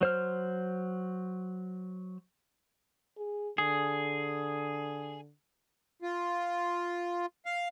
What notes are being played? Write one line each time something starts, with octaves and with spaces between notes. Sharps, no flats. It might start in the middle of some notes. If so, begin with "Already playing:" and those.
F#3 C5 F6
G#4
D3 G#4
F4
F5